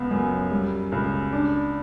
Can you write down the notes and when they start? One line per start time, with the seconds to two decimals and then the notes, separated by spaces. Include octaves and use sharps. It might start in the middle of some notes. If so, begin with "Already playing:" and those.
Already playing: C#2 B3
0.11 F#2
0.51 G3
0.92 C#2
1.32 D4